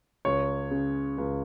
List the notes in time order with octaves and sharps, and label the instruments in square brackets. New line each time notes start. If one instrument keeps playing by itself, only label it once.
[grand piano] C#2 C#5
C#3
C#2